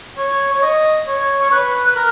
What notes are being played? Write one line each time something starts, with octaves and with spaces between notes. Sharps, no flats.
C#5
C#5
D#5
C#5
C#5
B4
B4
A#4